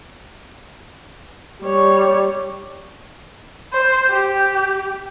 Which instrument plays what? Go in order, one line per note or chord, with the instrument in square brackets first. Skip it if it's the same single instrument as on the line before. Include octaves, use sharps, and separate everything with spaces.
[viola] G3 C#5
[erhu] C5
G4